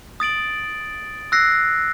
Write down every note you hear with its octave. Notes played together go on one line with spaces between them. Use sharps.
D#6 A6 D7 F#7
E6 F#6 A#6 C7